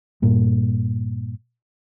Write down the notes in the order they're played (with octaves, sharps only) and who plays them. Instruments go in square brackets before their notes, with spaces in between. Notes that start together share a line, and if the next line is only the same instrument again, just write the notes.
[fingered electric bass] G2 A#2